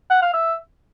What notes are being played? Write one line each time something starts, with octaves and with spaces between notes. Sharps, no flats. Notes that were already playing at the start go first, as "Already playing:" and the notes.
F#5
F5
E5